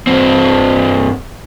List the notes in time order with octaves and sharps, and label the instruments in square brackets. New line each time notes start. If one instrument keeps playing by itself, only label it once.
[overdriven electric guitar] G2 C4